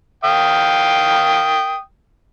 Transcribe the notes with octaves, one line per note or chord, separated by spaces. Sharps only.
F5 G5 D#6